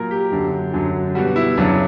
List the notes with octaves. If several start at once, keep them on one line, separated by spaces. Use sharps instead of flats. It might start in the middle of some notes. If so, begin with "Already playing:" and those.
Already playing: A#2 F#3 A#4
G4
F#2 D3 F#3
F#2 D3 F#3
B2 G3 F#4
E4
F#2 C#3 F#3 D4